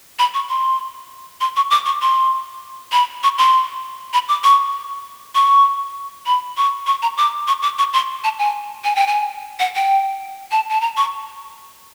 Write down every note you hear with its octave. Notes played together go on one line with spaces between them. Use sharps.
B5
C#6
C6
C6
C#6
D6
C#6
C6
B5
C#6
C6
B5
D6
C#6
C#6
B5
C#6
C#6
A#5
D6
C#6
D6
C#6
C6
A5
G#5
G#5
G5
G#5
F#5
G5
A5
A5
A#5
C#6